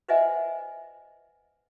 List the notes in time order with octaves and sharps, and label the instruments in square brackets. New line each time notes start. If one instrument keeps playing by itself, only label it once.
[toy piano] B4 C5 D#5 E5 F#5 G#5